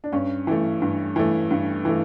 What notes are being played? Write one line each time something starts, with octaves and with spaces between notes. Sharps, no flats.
D4
G2 C#4
E3 A3
G2
E3 A3
G2
E3 A3